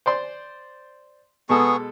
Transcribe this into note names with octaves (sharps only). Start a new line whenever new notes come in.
C5 D5 C6
B2 G#3 B3 G#4 A4 C#6